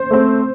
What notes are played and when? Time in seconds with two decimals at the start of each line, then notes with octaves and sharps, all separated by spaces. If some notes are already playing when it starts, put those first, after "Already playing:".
Already playing: C5
0.11 A3 C4